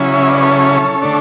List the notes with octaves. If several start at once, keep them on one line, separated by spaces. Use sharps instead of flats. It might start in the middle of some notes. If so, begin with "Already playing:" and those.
Already playing: C#3 F#3 C#4 E4
C#5 E5
B4 D5
A4 C#5
D3 A3 D4